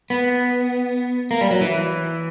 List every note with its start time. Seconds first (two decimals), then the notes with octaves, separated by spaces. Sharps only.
0.10 B3
1.31 A#3
1.41 G3
1.51 F#3
1.61 E3